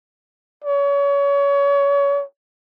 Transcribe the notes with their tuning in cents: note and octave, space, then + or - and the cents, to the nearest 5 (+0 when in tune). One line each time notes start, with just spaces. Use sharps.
C#5 +30